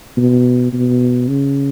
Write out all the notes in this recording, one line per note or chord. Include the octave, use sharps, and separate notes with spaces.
B2
B2
C#3